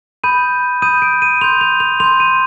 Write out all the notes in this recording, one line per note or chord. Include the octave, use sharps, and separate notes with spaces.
B5 D#6 G6 D#7
B5 D#6 G6 D#7
D7
D#7
C6 G6 F7
F7
F7
C6 G6 F7
D#7